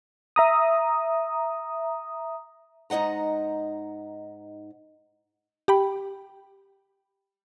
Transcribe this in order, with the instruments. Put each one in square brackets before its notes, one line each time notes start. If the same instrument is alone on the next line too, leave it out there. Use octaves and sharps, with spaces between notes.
[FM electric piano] E5 A#5 D#6
[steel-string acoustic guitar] G#2 D#4 D#5 F#5 A#5
[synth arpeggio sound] G4 G5 B5